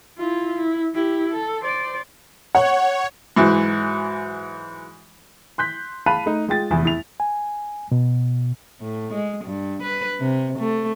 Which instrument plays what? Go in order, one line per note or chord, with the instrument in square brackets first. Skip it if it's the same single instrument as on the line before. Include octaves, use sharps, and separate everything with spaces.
[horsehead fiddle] E4 F4
E4
E4 G4
A4
C5 D5
[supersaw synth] C#5 [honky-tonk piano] F#5
[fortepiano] G#2 E3 F#3
[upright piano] C6 F#6 G6 B6
F5 A5 B5 F#6 D#7
A3 D#4
G#3 F4 G5 A6
F1 E2 E4 G#5
E4 F7
[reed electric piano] G#5
B2
[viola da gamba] A2
G#3
G2
B4
C3
A3